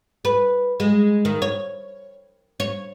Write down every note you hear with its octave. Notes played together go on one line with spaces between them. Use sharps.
B4
G#3
D#3
C#5
C#5